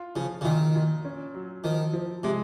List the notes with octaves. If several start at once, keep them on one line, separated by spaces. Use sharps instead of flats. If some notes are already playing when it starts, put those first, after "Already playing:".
Already playing: F4
C#3 F3
C#3
A#2 D#3
A#2
C#4
F#3
D#3 F3
F3
C3 G#3